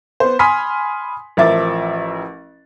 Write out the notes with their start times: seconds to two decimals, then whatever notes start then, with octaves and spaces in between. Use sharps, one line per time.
0.20 B3 C5
0.39 G#5 B5 C6 D#6 F6 B6
1.37 A1 F3 A#4 E5 D6 A6